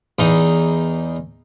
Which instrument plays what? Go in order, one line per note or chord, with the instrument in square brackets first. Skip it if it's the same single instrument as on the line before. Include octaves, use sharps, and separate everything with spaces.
[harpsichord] E2 D#4